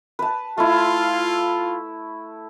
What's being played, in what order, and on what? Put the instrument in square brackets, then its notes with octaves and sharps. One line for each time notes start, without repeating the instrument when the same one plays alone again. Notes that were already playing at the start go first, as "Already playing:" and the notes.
[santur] B4 A5
[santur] A3 E4 [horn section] F4